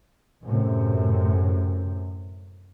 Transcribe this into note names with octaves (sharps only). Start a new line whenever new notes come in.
F#2 A2 C3